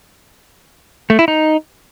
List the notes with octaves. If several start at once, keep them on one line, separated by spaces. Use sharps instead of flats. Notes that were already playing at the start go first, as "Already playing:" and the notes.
A3
E4
D#4